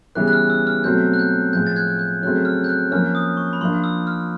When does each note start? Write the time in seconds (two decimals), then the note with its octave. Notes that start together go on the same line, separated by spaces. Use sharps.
0.15 C#3 E3 G3 B3 F#6
0.28 F#6
0.33 F6
0.50 E6
0.67 F6
0.84 B2 F#3 A3 C4 G6
1.14 F#6
1.19 G6
1.53 A2 F3 G#3 G6
1.67 A6
1.76 F#6 G#6
1.88 G#6
1.99 G6
2.23 C#3 F#3 A3 C4 F#6
2.45 F6
2.64 G6
2.69 F#6
2.91 F3 A#3 C#4 F6
3.15 D#6
3.37 C#6
3.53 B5
3.61 F3 A#3 D4 F4 C6
3.84 E6
4.07 F6